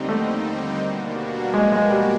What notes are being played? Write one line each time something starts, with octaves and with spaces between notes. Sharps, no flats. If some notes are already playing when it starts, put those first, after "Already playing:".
Already playing: D#2 D3 G3 C4 D#4
A3
B2 G3 A#3 D4 F#4
G#3
G#3
G3